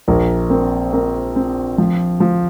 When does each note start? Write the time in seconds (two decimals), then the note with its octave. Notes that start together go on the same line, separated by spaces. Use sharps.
0.08 A#1 A#4
0.50 C4 A#4
0.93 C4 A#4
1.36 C4
1.78 F3
2.20 F3